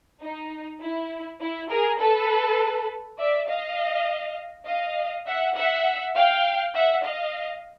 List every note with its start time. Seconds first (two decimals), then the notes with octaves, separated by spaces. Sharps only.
0.22 D#4
0.81 E4
1.41 E4
1.70 G#4 A#4
1.99 A4 B4
3.19 D5 E5
3.48 D#5 F5
4.66 D#5 F5
5.26 E5 F#5
5.55 E5 F#5
6.15 F5 G5
6.74 E5 F#5
7.03 D#5 F5